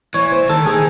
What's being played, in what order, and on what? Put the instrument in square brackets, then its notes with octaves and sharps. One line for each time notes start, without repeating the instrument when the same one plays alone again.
[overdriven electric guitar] E3 [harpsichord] C#5
[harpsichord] C5
[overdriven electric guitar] D#3 [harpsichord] A4
[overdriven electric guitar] D#3 [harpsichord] G#4